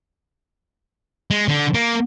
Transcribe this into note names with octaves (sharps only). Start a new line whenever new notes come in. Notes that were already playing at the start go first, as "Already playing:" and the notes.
G#3
D3
A#3